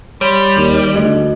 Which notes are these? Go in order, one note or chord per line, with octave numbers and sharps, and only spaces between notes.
G3 C#5 B5 C6
D#2 D6
D2 A3 D#4 D#5